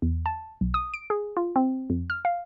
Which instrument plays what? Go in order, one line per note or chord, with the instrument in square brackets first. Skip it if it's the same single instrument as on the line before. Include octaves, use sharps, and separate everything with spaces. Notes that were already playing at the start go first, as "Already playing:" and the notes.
[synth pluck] E2
A5
B1
D#6
D7
G#4
F4
C4
F2
F6
F5